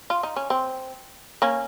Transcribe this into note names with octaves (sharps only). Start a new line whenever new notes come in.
F4
D#4
C#4
C4
A#3 C#4